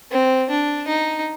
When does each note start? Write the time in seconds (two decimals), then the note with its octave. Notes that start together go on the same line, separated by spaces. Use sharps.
0.12 C4
0.50 D4
0.88 D#4